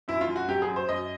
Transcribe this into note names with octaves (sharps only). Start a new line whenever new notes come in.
F#2 E4
F4
F#2
F#4
F#3 G4
G#4
F#2
C5
F#2 D#5